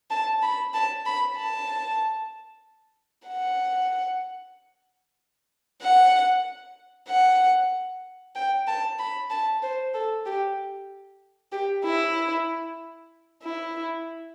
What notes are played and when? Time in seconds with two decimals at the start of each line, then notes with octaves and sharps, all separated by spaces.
0.10 A5
0.43 B5
0.74 A5
1.06 B5
1.37 A5
3.28 F#5
5.82 F#5
7.09 F#5
8.35 G5
8.67 A5
8.99 B5
9.30 A5
9.63 C5
9.94 A4
10.26 G4
11.52 G4
11.84 E4
13.43 E4